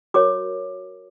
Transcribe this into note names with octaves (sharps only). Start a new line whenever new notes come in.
F#4 A#4 C#5 D6